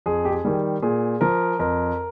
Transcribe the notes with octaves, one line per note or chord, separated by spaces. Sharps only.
F2 G#4
G4
G#4
D#3 G3
A#2 G#4
F3 A#4
F2 A#4